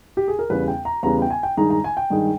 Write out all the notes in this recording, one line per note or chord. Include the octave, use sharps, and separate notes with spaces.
G4
G#4
A#4
E2 C#3 G3 B3 B4
G5
A#5
E2 C#3 G3 B3 A#5
G5
G#5
G5
G2 D#3 G#3 D#4 A#5
A#5
G#5
G5
G2 D#3 G#3 D#4